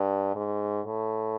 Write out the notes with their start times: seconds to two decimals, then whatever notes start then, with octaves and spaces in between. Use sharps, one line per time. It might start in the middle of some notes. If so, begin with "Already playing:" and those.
Already playing: G2
0.35 G#2
0.86 A2